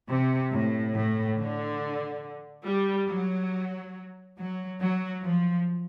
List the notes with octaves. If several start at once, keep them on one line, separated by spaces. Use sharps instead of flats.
C3
A2
A2
D3
G3
F#3
F#3
F#3
F3